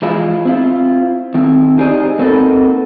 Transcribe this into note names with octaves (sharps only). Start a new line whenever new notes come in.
E3 F3 G#3 E4 F4
C4 E4 F4
D#3 C4 E4
D#4 G4 G#4 C5 D5 D#5
A#3 C4 D#4 F#4 A4 B4